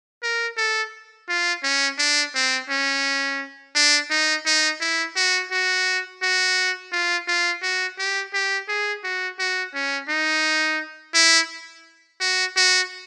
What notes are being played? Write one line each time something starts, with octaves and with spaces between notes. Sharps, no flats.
A#4
A4
F4
C#4
D4
C4
C#4
D4
D#4
D#4
E4
F#4
F#4
F#4
F4
F4
F#4
G4
G4
G#4
F#4
F#4
C#4
D#4
E4
F#4
F#4